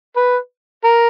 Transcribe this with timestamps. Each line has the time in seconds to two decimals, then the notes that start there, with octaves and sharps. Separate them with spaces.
0.16 B4
0.84 A#4